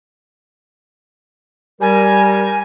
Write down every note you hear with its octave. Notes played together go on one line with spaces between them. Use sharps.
G3 A#4 G#5